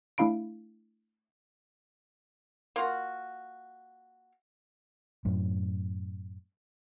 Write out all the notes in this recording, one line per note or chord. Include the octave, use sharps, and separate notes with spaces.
A3 D4 E4 F5 B5 D7
A#3 F4 F#4
F#2 A2